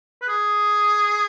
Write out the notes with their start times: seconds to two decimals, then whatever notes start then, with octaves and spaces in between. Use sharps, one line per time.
0.21 B4
0.28 G#4